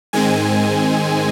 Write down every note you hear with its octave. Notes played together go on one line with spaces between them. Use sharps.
G#2 D#3 G#3 C4 G#5